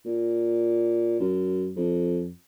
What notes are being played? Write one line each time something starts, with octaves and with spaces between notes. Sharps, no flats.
A#2
F#2
F2